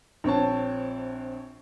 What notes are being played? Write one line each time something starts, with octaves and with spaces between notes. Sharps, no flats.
A#1 C4 C#5 A5